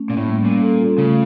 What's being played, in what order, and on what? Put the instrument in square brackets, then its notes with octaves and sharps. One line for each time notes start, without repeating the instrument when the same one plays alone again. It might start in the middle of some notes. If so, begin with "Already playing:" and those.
Already playing: [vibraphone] A3 C#4
[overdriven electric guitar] A#2 [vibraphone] A#3
[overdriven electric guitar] A2
[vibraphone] G3
[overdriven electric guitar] A#2 [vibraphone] C#4
[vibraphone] A4
F4
[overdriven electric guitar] C#3 [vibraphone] A3